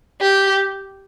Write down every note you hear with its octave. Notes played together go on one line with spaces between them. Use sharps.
G4